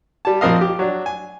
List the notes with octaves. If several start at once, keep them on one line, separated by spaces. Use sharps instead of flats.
G3 A5
A#1 F3 C4 A#4 D#5 F5
G4
F#3 D4
G#5